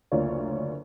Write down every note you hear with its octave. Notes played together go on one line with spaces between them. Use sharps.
F#1 D2 A#3 F4 C#5 D5